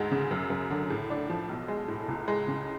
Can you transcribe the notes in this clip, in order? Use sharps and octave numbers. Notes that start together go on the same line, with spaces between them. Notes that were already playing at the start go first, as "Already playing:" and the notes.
Already playing: D2 G#2 G#3
C#3
F#2
F#2
D3
A2
D4
F3
B1
G#3
A2
C#2
G#3
C#3